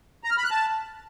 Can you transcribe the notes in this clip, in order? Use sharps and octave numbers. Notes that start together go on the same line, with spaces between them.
A#5
F6
B5
F#6
A5